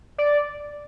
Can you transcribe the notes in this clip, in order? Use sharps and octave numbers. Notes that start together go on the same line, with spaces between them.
D5